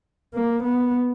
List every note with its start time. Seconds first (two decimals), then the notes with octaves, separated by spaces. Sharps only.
0.34 A#3
0.64 B3